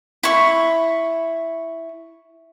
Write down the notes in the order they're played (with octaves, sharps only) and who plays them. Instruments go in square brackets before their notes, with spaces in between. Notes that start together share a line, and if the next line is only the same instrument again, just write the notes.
[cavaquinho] E4 C#6